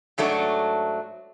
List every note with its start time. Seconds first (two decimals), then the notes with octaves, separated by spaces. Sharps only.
0.18 G#2 F#3 A3 D4